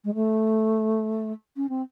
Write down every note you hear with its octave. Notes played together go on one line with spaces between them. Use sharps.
G#3
A3
C#4
C4